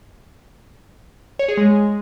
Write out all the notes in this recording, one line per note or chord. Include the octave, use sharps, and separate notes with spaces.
C#5
G#4
G#3